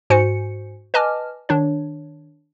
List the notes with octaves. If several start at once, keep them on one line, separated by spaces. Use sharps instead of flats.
G#2 F#4 C5 G#5 C#7
B4 D#5 G#5 A5 D6 F6
D#3 D4 C#5